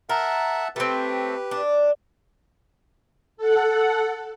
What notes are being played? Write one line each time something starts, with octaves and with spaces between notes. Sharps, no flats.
A#4 E5 F#5 A5
A3 C4 G4 B4
D4
A4 F#5